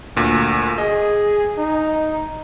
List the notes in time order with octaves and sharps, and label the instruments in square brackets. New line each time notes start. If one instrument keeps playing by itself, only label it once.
[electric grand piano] D2 A#2
[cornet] G#4 [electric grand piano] D#5
[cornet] D#4